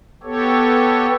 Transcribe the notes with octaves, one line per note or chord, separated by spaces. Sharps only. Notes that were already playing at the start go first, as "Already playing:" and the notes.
B3 G4 A4 C#5